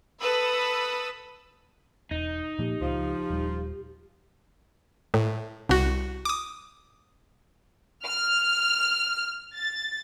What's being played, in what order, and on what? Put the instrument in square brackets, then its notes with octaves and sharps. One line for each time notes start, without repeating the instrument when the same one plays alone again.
[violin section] A4 B4 B5 D#6 E6
[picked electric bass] E1 [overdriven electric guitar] D#4
[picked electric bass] A#2 F3 A#3 [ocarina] G4
[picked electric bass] C#2 [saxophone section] F3
[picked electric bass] D#1 G3
[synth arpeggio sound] A2
C2 F#4
D6 D#6
[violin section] F6
A6